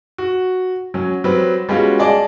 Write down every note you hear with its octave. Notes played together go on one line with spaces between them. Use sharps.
F#4
F#3 C#4
F#3 G3 C4 B4
G3 G#3 B3 C#4 F4 F#4
G#4 D5 D#5 G#5 A5 D6